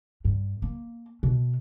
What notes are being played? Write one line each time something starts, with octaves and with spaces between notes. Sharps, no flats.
G2
A#3
B2